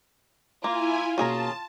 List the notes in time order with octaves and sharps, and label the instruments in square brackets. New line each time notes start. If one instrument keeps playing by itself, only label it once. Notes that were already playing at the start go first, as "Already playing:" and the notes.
[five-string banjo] A#3 [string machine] E4 G#5 [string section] F4
[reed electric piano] B2 A#3 F#4 [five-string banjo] C#4 G#4 A#4 [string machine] A5